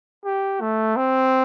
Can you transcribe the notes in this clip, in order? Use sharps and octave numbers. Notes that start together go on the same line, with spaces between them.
G4
A3
C4